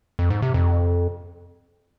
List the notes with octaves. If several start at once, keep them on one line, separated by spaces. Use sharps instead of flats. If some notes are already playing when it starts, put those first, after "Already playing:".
F2
G#2
C3
F2